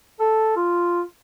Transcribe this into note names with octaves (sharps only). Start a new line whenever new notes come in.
A4
F4